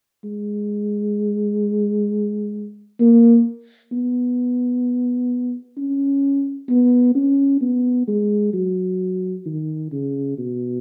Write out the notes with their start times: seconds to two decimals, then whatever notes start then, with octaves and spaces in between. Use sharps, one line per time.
0.24 G#3
3.00 A#3
3.92 B3
5.77 C#4
6.69 B3
7.15 C#4
7.61 B3
8.08 G#3
8.53 F#3
9.46 D#3
9.92 C#3
10.38 B2